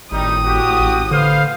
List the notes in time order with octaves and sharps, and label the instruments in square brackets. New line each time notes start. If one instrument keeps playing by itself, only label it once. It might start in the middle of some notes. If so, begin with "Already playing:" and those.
[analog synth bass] G#1 [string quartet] A2 D#6 [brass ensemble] G3 D#4
[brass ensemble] F#4 G4
[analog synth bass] A1
[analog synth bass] D3 [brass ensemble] B4 C5 F5